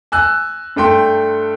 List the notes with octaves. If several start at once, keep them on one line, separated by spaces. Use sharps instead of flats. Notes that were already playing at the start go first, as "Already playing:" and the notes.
G#5 E6 F#6
G2 A3 G5 C6